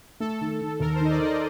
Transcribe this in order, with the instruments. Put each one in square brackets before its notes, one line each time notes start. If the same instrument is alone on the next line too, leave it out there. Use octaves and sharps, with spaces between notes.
[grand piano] A3 [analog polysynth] A4
[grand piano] D#3
D#3
[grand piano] D#2 [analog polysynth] A#4
[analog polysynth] C5
[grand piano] D#3 [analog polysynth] D#5
[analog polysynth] D5
[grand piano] D#3
[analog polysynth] D#5